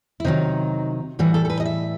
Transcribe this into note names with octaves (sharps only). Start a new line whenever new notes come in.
E4
C3 D#3 F#3 D#4
A2 E3 G3 F#4
A4
A4
B4
D#5
E5